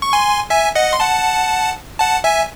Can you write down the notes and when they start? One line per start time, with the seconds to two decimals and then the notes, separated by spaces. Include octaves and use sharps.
0.02 C#6
0.13 G#5 C6
0.50 E5 G#5
0.75 D#5 F#5
0.93 C6
1.00 F#5 A5
1.99 F#5 A5
2.24 E5 G#5